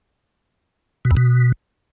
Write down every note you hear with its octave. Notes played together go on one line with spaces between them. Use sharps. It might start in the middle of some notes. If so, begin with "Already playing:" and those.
B2
E2
B2